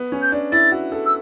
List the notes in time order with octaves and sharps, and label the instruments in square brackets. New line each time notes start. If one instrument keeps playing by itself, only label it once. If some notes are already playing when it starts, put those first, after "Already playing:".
Already playing: [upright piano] B3
C#4
[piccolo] G6
[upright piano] D4
[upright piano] E4 [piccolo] A6
[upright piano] F#4
A4
[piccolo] E6